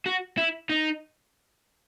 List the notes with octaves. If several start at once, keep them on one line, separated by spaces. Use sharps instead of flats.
F#4
E4
D#4